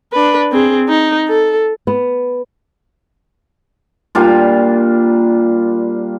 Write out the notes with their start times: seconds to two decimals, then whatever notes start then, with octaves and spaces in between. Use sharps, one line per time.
0.13 D4 B4
0.52 C4 G#4
0.88 D#4
1.29 A4
1.87 B3
4.15 A#2 G3 D4 F4